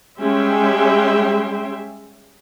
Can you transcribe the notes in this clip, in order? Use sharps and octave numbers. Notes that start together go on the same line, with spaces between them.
G3 G#3 C#4 E5 G5 C6